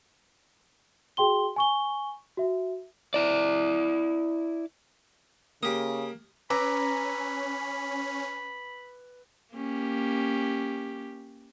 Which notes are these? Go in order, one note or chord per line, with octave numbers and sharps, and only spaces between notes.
F#4 G#4 G5 C6 G7
G#5 C#6 G7
F#4 E5
E4 D5
C#3 A#3 G4 D#6
C#4 B4 A#5 B5 D6 E6
A#3 C#4 G4